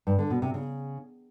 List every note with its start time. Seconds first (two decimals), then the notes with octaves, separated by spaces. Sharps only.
0.07 G2
0.19 D3
0.30 B2
0.42 C3
0.54 C#3